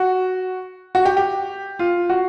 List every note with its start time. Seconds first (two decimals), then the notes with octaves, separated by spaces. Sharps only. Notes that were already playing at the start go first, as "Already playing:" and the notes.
Already playing: F#4
0.95 F#4
1.05 G4
1.17 G4
1.79 F4
2.10 F#4